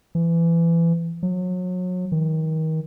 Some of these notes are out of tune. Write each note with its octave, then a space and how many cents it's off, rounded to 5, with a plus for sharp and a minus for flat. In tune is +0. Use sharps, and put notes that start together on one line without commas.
E3 +25
F#3 -30
D#3 +30